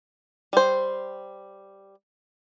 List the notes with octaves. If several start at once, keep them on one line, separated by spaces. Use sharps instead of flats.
G3 C5